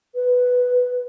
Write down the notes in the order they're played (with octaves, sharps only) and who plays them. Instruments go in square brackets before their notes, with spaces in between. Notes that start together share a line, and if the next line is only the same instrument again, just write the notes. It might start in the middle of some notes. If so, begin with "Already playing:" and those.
[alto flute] B4